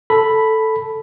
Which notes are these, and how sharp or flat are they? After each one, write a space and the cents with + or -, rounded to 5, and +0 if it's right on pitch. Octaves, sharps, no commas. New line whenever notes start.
A4 +0 B5 +0